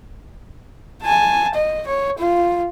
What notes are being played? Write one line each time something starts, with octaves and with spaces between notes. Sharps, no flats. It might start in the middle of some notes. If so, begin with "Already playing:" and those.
G#5 A5
D#5
C#5
F4